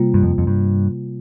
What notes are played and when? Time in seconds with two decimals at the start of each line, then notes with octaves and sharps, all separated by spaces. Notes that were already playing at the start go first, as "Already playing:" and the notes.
Already playing: C3 G3 A#3 F4
0.14 G2
0.23 F2
0.38 F2
0.47 G2